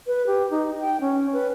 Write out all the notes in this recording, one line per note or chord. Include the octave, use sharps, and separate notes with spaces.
B4
G4
D#4
G5
C#4
B4